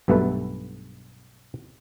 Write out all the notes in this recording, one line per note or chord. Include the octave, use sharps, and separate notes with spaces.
B1 G2 B2 A3 A4 B4